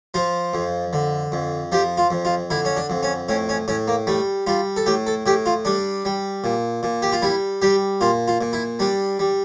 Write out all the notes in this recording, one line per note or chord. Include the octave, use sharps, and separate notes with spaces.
F3 F4
F2
D3
F2
F3 G4
F4
F2
F4
D3 E4
C#4
D4
F2
C#4
A2 C#4
C#4
A2 C#4
A#3
G3 A3
G3 F4
A4
A2 G4
A4
A2 G4
F4
G3 D4
G3
A#2
A#2
G4
F4
G3 E4
G3 G4
A#2 F4
F4
A#2
E4
G3 D4
G3